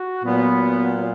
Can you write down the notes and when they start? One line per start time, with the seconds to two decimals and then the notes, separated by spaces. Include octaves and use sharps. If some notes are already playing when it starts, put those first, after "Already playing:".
Already playing: F#4
0.24 A#2 F#3 B3